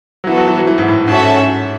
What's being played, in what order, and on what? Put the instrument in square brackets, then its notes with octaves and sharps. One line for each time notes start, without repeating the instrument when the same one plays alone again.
[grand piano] F#3
[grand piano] E3 [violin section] B3 F#4 A4
[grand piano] F#3
E3
F#3
E3
G#2
A2
[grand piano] G#2 [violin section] C#4 F#4 A4 E5 A5